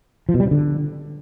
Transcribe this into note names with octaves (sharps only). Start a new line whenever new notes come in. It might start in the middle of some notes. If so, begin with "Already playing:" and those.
F3
B2
G3
C3
D3